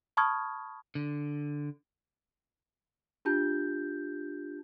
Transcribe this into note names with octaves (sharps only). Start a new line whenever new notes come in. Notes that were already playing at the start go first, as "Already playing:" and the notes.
A5 B5 C#6 D#6 F6 G#6
D3
D4 F4 G4 A5 G6